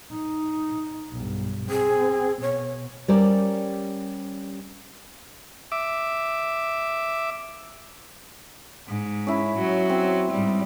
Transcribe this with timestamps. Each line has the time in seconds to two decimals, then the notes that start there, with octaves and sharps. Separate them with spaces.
0.12 D#4
1.12 B1 G2
1.70 C4 G#4
2.42 B2 C#5
3.08 G3 C#4 G4 A#4 C5 D5
5.72 E5 D6
8.88 G#2
9.27 C#4 E4
9.58 F#3
9.89 C4
10.31 G#2 G3